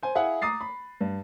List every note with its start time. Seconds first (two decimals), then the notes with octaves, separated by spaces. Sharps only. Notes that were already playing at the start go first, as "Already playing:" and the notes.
0.03 C5 G#5
0.15 E4 G#4 F5 F#5
0.42 A#5 D6 D#6 A6 C7
0.61 B5
1.01 G2